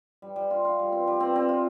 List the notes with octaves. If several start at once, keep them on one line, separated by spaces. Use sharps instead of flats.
G3
G3
F4
F4
G3
C4
G3
C4
C4
F4